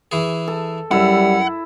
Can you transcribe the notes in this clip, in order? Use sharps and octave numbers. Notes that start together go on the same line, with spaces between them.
E3 G#4
A4
F#2 G3 E4 E5 F#5